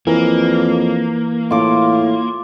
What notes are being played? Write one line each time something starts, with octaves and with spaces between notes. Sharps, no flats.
F2 E3 A#3 A#4
A2 F4 D6